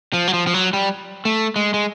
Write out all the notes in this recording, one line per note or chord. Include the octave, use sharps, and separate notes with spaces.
F3
F#3
F3
F3
F#3
G3
A3
G#3
G#3